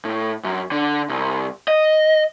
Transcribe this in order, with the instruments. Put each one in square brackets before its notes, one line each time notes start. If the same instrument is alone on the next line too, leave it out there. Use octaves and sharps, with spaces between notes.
[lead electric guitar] A2
F#2
D3
C2
D#5